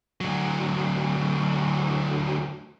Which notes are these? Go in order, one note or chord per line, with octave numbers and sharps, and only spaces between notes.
D2 F#3